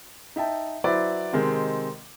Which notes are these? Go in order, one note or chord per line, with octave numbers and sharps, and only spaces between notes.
D#4 E5 G5 A5
F#3 E4 B4 C5 D5 E5
C3 D#3 G#3 C4